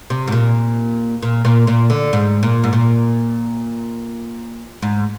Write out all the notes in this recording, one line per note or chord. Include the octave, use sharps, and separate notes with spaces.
C3
G#2
A#2
A#2
A#2
A#2
D3
G#2
A#2
G#2
A#2
G#2